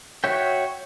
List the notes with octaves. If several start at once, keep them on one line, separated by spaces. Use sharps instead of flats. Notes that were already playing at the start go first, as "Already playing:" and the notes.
F#4 C#5 E5 G5